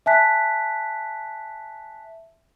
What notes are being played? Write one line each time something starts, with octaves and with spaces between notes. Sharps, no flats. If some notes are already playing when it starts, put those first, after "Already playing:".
E5 G#5 A5 F#6 B6